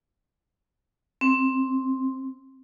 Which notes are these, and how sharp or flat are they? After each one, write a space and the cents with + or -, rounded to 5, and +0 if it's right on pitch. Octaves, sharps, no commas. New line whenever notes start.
C4 +5